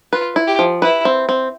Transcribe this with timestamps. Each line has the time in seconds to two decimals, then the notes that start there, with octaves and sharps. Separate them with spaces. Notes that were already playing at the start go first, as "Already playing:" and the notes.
0.13 F4 B4
0.36 E4
0.47 G4
0.59 F3
0.82 E4 B4
1.05 C4
1.29 C4